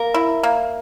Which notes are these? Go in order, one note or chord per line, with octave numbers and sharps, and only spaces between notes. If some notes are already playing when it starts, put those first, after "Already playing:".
Already playing: A#3 A#4
E4
A#3